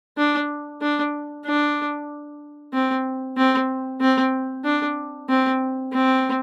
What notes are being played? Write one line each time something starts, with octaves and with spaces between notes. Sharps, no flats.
D4
D4
D4
C4
C4
C4
D4
C4
C4